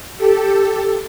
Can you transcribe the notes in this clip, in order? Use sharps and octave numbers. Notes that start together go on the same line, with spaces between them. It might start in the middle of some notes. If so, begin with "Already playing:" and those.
G4 A4